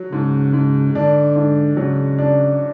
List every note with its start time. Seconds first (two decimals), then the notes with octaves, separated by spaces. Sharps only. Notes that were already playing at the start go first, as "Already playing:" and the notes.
Already playing: F#3
0.11 G#2 C#3
0.53 G#2
0.95 D3 D4
1.36 G#2
1.77 C#3 F#3
2.19 D4